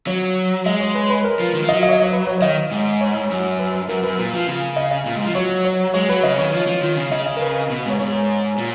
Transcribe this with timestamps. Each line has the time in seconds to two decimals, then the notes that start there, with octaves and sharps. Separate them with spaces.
0.07 F#3 C#5
0.66 G#3 D#5
0.80 C#5
0.95 B4
1.10 B4
1.24 A#4
1.40 F3
1.54 D#3
1.63 F3
1.69 F#3 D#5
1.83 D#5
1.89 C#5
1.93 D#5
2.02 C#5
2.13 B4
2.27 C#5
2.38 C#5
2.42 D#3 D#5
2.71 G#2
3.01 C#5
3.30 F#2
3.59 B4
3.89 F#2 A#4
4.03 F#2 B4
4.18 A#2
4.33 F3
4.48 C#3
4.76 D#5
4.91 D#5
5.06 A#2
5.15 G#2
5.25 F3
5.35 F#3 C#5
5.65 C#5
5.94 G#3 C#5
6.09 F#3 B4
6.23 C#3 D#5
6.38 D#3 C#5
6.53 F3
6.67 F3
6.83 D#3
6.96 C#3
7.11 C#3 D#5
7.26 D#5
7.36 A#4
7.41 B4
7.70 B2
7.80 B4
7.85 G#2 C#5
8.00 G#2 C#5
8.58 A#2